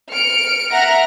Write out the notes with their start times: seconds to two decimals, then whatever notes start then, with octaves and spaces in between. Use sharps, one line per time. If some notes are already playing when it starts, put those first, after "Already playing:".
0.12 F6 C#7 D7
0.72 E5 F#5 A#5 F6 A#6